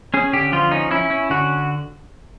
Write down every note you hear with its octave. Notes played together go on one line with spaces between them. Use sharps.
C#4 G#4
D3 G4
F3 F4
C#4 D#4
C#4 E4
C#4
D3 F#4